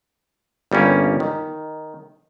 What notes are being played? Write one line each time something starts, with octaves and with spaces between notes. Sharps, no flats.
G1 G3 A#3 C#4 G4
D#3